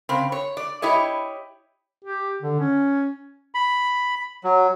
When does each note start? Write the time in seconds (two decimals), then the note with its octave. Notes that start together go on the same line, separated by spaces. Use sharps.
0.09 C#3 C4
0.32 C#5
0.57 D5
0.82 E4 G4 C#5 D#5
2.04 G4
2.42 D3
2.60 C#4
3.55 B5
4.44 F#3